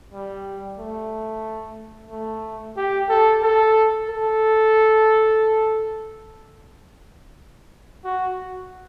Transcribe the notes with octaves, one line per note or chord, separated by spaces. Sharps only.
G3
A3
A3
G4
A4
A4
A4
F#4